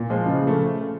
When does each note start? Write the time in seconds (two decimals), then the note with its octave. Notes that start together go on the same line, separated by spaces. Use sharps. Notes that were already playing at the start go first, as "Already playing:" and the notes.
Already playing: A#2
0.10 F3 G#3
0.26 C#3
0.43 F3 A3